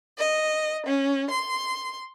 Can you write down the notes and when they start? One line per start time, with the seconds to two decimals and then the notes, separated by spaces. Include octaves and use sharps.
0.18 D#5
0.86 C#4
1.30 C6